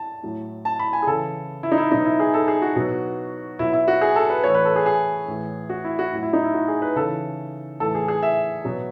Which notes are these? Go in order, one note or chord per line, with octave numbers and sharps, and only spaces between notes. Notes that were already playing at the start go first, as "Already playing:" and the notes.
Already playing: A5
A2 F#3
A5
B5
G#5
G#4
C#3 E3 A4
E4
D#4
E4
B2 F#3 D#4
E4
G#4
A4
G#4
F#4
B2 F#3
B2 F#3 E4
E4
F#4
G#4
A4
B4
A2 E3 C#5
B4
A4
G#4
G#4
A2 E3
F#4
E4
F#4
A2 F#3
E4
D#4
E4
F#4
G#4
B4
C#3 E3 A4
A2 E3 A4
G#4
G#4
E5
B2 F#3